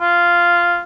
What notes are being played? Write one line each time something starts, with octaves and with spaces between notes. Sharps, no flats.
F4